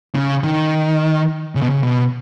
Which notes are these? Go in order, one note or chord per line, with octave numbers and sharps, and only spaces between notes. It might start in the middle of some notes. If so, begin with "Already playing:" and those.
C#3
D#3
C#3
B2
C#3
B2